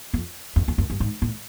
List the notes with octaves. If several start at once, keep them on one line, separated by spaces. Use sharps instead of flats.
F2
F2
F2
F#2
G2
G#2
A2